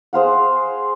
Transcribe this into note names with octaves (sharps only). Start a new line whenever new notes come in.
G#4 C5 F5 F#5